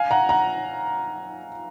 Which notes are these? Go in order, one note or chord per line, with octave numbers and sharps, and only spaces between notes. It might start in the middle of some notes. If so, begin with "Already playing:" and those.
Already playing: F5 G#5
F#5 A#5
F#5 A#5